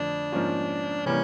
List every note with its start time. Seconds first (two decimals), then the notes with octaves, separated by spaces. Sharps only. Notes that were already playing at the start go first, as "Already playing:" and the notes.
Already playing: F2 D3 F3 A3 D4
0.32 G#2 F3 A#3 C#4 F4
1.06 C3 E3 G3 A#3 C#4